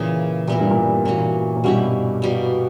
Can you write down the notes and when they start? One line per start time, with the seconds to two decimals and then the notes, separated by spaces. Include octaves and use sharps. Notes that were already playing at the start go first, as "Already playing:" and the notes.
Already playing: A#2 C#3 E3 A#3
0.47 A#2 G3 B3 E4 A#4
0.60 G2
0.71 A#2
1.05 A#2 E3 A#3 C#4 F#4
1.57 A#2
1.64 G2 B2 A#3 C#4 E4 G4
2.22 B2 G3 A#3